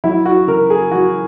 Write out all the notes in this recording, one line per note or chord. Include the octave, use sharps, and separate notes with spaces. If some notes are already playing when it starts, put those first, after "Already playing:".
F#3 E4
F#4
C#3 A#4
G#4
F#3 F#4